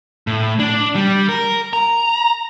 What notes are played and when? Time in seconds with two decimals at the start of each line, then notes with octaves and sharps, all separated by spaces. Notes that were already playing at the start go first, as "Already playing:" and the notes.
0.27 A2
0.60 D4
0.95 G3
1.29 A#4
1.73 A#5